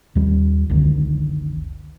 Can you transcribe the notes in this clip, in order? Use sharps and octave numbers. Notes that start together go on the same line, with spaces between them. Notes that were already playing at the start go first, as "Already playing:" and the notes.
D#2 G3
F#1 C#2 D3 D#3